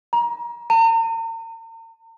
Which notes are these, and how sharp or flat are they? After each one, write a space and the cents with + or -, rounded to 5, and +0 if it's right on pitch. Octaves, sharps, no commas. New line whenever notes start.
A#5 +30
A#5 -45